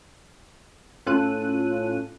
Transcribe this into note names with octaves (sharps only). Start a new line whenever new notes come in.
A2 C#4 F4 A4 F#6 D#7